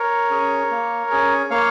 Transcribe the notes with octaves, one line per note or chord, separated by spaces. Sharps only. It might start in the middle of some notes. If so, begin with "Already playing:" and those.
Already playing: A#4 C#5
C#4 G#4
A#3
C#4 G#4
A#3 C#5 F5